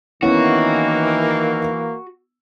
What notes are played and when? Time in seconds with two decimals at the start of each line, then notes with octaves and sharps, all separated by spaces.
0.23 D#3 E3 A#3 B3 C#4 E4 F#4